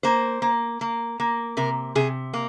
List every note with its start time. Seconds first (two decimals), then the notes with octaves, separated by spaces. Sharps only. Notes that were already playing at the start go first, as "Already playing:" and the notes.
0.03 A#3 C5
0.42 A#3
0.81 A#3
1.20 A#3
1.57 C3 A#4
1.95 C3 G#4
2.34 A#3